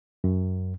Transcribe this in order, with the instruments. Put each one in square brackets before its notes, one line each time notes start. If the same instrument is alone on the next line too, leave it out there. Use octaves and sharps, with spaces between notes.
[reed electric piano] F#2